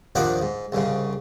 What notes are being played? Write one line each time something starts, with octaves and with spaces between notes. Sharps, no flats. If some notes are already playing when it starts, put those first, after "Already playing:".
D#2 F3 D4 D#4 F#5
G#2
C2 G#2 C#3